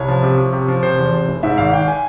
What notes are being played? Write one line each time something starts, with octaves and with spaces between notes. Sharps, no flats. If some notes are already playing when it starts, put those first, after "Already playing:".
Already playing: C2 C#5
F3
C3
F3
C3
F3
C3 C5
E2
C3
F1
G#2 E5
G#1 F5
G#1 G5
G#5